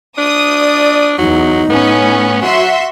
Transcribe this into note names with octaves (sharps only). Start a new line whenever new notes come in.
D4 D#6
D5
E2 F#3 D#4
A2 B3 C#4
F#3 F#4 E5 F#5 C6